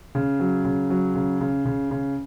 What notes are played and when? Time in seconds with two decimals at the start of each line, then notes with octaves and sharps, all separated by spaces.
0.15 C#3
0.40 F#3
0.65 C#3
0.90 F#3
1.15 C#3
1.40 C#3
1.65 C#3
1.91 C#3